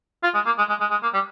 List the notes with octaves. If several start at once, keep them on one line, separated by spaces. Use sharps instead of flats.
F4
G#3
A#3
G#3
G#3
G#3
G#3
A#3
G3